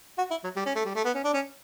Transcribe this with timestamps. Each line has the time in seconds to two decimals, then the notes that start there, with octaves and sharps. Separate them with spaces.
0.18 F#4
0.31 E4
0.44 F#3
0.56 G3
0.66 C#4
0.75 A3
0.85 G3
0.95 A3
1.05 B3
1.15 C#4
1.24 D4
1.34 C#4